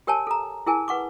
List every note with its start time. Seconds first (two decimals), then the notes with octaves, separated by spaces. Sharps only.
0.07 G4 A#4 C#5 G#5 A5
0.27 A4 A#5
0.66 E4 G#4 A#4 G#5 A5
0.88 B4 F#5 C#6 D6